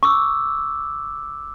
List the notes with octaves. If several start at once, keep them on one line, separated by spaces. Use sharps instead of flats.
C#6 D6 E6